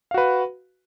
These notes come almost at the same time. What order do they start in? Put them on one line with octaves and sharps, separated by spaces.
F5 F#4 B4